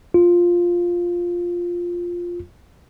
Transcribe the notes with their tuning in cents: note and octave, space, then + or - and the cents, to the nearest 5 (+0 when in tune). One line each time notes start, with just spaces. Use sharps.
F4 +0